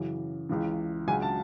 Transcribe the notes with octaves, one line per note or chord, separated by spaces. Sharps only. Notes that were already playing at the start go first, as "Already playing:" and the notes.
Already playing: F#2 C#3 E3
C#2 C#3 E3
C#2 C#3 F#3 G#5
A5